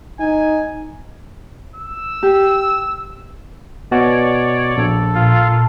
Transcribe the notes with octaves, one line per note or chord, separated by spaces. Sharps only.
D#4 G#5
E6
G4
B2 F#4 C#5 D5
A#1 A4
A#2 F4 F5